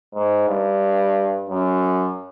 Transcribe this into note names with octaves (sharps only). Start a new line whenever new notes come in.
G#2
G2
F#2